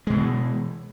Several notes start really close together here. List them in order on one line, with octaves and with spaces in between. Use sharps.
G#3 B2 E3